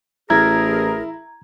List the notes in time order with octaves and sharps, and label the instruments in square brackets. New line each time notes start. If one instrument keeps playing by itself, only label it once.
[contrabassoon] A1 [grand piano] E4 [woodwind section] G#4 A#4 [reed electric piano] A#5 G#6